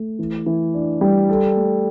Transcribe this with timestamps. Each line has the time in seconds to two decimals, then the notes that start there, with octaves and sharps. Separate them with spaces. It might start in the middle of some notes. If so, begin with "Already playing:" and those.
Already playing: A3
0.19 E3
0.46 E3
0.74 D4
1.01 G3
1.29 A4
1.56 A3